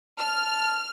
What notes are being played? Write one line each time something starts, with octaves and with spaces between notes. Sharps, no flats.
A5 F6